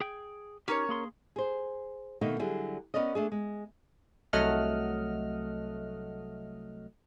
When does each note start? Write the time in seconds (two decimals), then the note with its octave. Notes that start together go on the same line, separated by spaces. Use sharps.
0.01 G#4 G5
0.68 C#4 D#4 G4 A#4 C#5
0.89 A#3 G#4 C6
1.36 G#4 C5
2.21 B2 D#3 A3 A#3 D#4
2.39 D3 F#3 G3 E4 G#4
2.94 B3 C#4 A#4 D5 D#5
3.15 A3 D4 G#4
3.32 G#3
4.33 C2 F#3 A3 D#5 F#5 F6